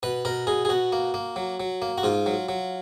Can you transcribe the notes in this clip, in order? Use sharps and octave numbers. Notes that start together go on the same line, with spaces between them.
B2 B4
B2 A#4
B2 G#4
G#4
B2 F#4
A#3
A#3
F#3
F#3
A#3
F#4
G#2 F4
F#3
F#3